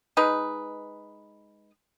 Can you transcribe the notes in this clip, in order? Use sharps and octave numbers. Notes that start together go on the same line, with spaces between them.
G#3 D#4 B4